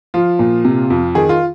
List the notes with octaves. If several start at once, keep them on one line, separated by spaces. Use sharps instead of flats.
F3 F4
A#2
C3
F2
D#3 G#4
F4